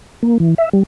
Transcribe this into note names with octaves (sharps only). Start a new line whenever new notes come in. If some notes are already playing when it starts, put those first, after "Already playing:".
A#3
E3
E5
G3